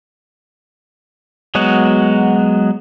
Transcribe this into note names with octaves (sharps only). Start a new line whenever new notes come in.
F#3 G#3 B3 F#4